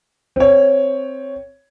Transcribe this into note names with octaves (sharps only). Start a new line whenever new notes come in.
C4 C#5